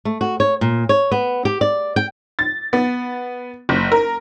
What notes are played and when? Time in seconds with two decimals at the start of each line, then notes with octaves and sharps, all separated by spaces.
0.05 A3
0.21 F#4
0.40 C#5
0.61 A#2
0.89 C#5
1.12 B3
1.45 G4
1.61 D5
1.96 G5
2.39 A6
2.73 B3
3.69 F#1
3.92 A#4